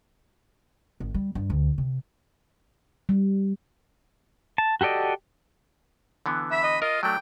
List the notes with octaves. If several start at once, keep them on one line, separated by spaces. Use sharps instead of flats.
G#1
G3
G2
D2
C3
G3
A5
F#4 G4 A4 D5 D#5
D3 E3 B3
E5 B5
D#5
F4 A#4 D#5
F#3 A3 D4 G5